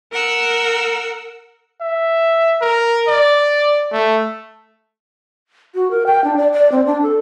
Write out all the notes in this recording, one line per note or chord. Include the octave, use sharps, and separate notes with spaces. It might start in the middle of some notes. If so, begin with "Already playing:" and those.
A#4 F#5 E6
E5
A#4
D5
A3
F#4
A#4
G5
D4
D5
D5
C4
D4
A4